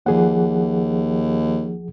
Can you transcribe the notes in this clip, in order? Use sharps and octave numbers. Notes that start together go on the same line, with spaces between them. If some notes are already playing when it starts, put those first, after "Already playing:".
D#2 F3 G#4 F#5